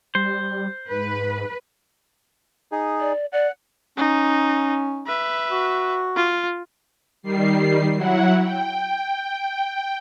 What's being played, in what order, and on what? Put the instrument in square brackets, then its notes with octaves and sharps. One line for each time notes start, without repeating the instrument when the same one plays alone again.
[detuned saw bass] G3 [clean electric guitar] C5
[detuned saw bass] G#2 [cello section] B4
[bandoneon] D#4 G#4
[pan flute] D5
[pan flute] D5 [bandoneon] F#5
[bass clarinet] C#4 [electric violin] D#4
[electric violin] B4 E5
[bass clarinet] F#4
[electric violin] F4
[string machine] D#3 G3 C7
F#3 E4 F#5
G5